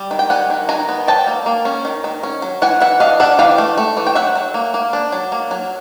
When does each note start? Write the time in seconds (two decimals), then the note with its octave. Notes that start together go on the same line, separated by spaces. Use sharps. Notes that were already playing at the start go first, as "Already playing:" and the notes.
Already playing: G3
0.11 D#3
0.19 G5
0.30 G3 F#5 G#5
0.50 D#3
0.69 D#3 G#5 A#5
0.89 B3
1.07 F#3 G5 A5
1.27 A#3
1.46 A#3
1.65 C#4
1.85 D#3
2.04 D#3
2.23 C#4
2.42 F#3
2.62 E3 F#5 G#5
2.80 E3 E5 F#5
3.00 D4 D#5 F5
3.20 D4 E5 F#5
3.39 E3 F5 G5
3.58 A3
3.78 A3
3.97 E3
4.07 G5
4.15 F#3 E5 F#5
4.35 F#3
4.54 A#3
4.74 A#3
4.93 D4
5.12 F#3
5.32 A#3
5.51 F#3